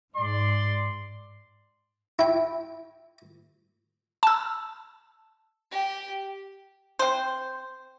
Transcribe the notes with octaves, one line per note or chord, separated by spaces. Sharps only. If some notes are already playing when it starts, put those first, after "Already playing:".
G#2 D5 C6
E4 G5
A5 E6
G4
C4 C5